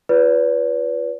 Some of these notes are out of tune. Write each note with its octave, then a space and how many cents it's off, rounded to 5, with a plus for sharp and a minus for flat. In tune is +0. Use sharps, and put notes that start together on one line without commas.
F4 +0 B4 +0 D5 -45